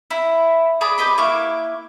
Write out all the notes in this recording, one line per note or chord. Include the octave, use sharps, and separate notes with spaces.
E4
D4 G#4 B5 D6
G4 B4 D#5 B5
A#3 E4 C#6 D6